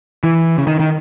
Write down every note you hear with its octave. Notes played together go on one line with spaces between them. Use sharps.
E3
C#3
D#3
D#3